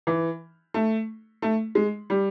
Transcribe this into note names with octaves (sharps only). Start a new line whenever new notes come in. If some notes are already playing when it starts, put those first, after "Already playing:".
E3
A3
A3
G#3
G3